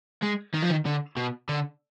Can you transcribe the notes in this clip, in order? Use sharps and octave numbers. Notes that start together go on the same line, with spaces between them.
G#3
D#3
F3
D#3
D3
B2
D3